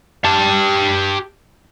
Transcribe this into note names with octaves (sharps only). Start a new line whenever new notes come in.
G4 A5